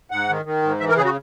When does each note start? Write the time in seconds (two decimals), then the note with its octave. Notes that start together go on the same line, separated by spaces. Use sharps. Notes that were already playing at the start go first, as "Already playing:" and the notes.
0.11 G#2 F#5
0.29 D#3
0.45 D#3
0.62 G#2
0.80 E3 E5
0.89 A#4
0.96 C#3 G#4
1.05 F#4